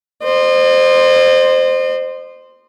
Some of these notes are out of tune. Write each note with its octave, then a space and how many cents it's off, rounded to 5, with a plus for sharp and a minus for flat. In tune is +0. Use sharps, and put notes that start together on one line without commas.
C5 +0 D#5 -40